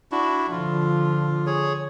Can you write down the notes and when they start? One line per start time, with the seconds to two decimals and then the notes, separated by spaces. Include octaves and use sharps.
0.12 D4 E4 F#4
0.51 D3 F3 F4
1.46 G#4 C#5